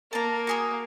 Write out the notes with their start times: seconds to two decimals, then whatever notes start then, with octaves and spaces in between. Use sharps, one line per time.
0.13 A#3 A5 A#5
0.47 F#4 G#4 A#4